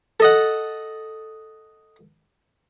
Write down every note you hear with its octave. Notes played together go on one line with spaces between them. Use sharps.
A4 D#5 F#5